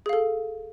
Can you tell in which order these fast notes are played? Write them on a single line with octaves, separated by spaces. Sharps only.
G#4 F5 A4